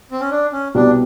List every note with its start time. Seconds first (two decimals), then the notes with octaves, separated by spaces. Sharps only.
0.11 C4
0.21 C#4
0.31 D4
0.53 C#4
0.75 C2 B2 G3 D4